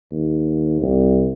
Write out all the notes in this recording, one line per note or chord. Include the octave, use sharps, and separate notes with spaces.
D#2
C2